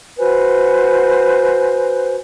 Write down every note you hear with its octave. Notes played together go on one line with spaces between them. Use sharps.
F#4 B4 C5 G#5